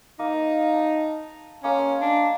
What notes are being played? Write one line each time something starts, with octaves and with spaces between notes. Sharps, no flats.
A#3 D#4
A5
G#3 A#3 C#4
D4